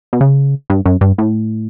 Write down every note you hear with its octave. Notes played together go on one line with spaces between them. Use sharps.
B2
C#3
G2
F#2
G2
A2